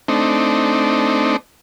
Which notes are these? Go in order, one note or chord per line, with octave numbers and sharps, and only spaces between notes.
A3 C4 D4 D#4